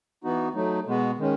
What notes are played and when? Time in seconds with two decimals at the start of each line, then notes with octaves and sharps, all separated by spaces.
0.24 E3 B3 D#4 F#4
0.54 F#3 A3 D#4
0.87 B2 G#3 B3 F#4
1.18 D#3 G#3 C#4